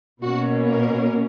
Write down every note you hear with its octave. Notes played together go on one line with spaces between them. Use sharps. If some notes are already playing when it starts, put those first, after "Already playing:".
B2 A#3 C#4 F#4
A#4